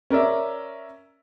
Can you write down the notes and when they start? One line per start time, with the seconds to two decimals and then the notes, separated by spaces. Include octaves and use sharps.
0.10 C#4 A#4 D5 E5